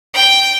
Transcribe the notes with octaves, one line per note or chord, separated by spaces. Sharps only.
G5